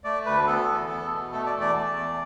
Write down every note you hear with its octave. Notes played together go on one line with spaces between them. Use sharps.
A3 D5
D2 B4
B3 A4
E2
B3
B2
A3 A4
D5
E2
D5
A3
E2